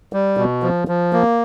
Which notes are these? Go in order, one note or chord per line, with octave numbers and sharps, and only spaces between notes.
G3
B2
F3
F3
A#3